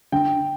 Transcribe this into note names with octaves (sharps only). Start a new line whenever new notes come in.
D3 G5